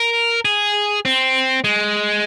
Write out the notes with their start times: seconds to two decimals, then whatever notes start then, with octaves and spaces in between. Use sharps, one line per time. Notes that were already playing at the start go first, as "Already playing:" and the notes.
Already playing: A#4
0.45 G#4
1.05 C4
1.64 G#3